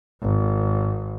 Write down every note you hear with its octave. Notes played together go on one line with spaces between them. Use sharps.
G#1